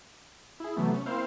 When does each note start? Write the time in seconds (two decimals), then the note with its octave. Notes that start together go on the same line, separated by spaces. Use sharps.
0.60 E4 G#4
0.76 C3 E3 F#3 A3 B3
0.94 C#4
1.06 A#3 C4 E4 C5 F5